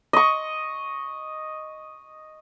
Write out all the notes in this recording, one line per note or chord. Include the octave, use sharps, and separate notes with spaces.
D#5 C#6